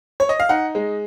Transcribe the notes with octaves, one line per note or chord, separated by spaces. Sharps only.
C#5
D#5
F5
D#4 F#5
G#3